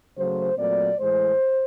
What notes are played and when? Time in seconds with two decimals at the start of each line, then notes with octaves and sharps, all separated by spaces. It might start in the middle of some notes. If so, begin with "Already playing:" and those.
0.17 C#3 F#3 A3 C5
0.58 A#2 F#3 A3 C4 D5
0.99 A2 E3 G#3 C5